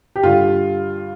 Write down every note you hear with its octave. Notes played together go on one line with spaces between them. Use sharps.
G4
G2 D3 G3 F4